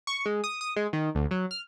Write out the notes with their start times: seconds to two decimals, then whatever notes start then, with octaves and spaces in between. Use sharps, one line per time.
0.07 C#6
0.25 G#3
0.44 D#6
0.61 D#6
0.76 G#3
0.93 D#3
1.15 D2
1.31 F#3
1.51 F6